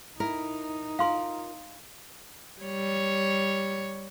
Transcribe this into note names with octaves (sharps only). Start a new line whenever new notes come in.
D#4 E4 A#4
F4 A#4 F5 C6
G3 C#5